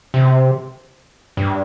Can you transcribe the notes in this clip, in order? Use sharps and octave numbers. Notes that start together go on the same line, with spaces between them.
C3
G2